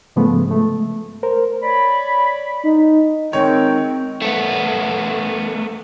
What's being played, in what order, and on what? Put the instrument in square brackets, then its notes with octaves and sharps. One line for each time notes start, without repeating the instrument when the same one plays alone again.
[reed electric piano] G#2 C#3 F3 G#3 A3 B3
A3
A#4 C5
[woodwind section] C#5 D5 B5
[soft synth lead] D#4
[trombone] D#3 [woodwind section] G#3 G5 [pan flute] C4 [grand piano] C#5
[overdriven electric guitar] A3 B3